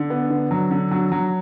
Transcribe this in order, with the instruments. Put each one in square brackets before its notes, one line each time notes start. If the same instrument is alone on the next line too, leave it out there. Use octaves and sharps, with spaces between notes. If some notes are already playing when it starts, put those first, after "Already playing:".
Already playing: [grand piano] D3
B3
D3
F#3
D3
F#3
F#3